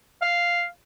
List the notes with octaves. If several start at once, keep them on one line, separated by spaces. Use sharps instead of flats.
F5